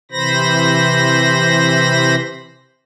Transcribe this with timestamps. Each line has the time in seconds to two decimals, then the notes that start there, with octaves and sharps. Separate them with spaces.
0.11 C3 E3 C5 B5 A#6